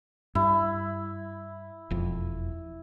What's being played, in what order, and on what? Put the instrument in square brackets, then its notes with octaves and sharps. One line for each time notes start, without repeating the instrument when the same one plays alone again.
[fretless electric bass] G2 [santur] E4
[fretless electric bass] E1 F2